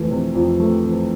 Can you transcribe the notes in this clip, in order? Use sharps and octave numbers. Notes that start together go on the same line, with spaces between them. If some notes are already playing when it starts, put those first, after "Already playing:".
Already playing: F2 E3 A3
C3
F2
A3
E3